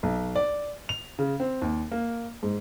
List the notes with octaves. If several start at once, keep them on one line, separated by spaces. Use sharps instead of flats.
B1
D5
F7
C#3
C4
D#2
A#3
G#2